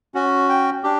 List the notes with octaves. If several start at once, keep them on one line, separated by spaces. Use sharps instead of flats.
C#4 F#4
G5
D4 G4